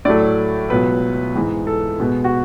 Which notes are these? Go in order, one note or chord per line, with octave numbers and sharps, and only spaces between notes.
A2 F#3 A3 D5
C#2 B2 F#3 B3 B4
G#2 E3 G#3
A4
B2 G#3 B3
F#4